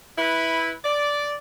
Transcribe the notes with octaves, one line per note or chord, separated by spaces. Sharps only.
E4 B4
D5